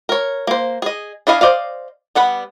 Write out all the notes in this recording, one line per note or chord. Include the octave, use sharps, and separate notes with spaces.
A#4 C#5
A#3 C5
G#4 D#5
D4 E4 D#5 F5 G#5
C5 D5 D#5 F5
G3 B3 F#5 B5